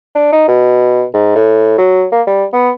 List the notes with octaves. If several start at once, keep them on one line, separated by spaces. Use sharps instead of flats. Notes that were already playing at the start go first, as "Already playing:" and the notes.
D4
D#4
B2
G#2
A2
F#3
A#3
G3
B3